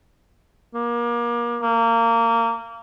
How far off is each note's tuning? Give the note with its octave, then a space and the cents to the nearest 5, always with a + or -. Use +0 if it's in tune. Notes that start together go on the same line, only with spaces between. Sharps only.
A#3 +30
A#3 -20